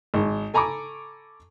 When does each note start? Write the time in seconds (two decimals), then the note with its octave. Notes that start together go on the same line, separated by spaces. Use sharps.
0.14 G#1
0.54 A4 G#5 A#5 B5 C#6 D6